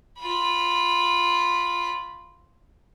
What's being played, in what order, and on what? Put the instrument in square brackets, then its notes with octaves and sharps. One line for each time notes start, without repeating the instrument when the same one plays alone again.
[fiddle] F4 B5